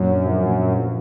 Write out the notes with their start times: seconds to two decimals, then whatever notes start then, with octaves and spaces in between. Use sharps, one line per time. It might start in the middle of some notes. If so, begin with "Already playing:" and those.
Already playing: F#2 A#2 A#3
0.08 D4
0.25 F3
0.42 A#2
0.59 A#3
0.76 F3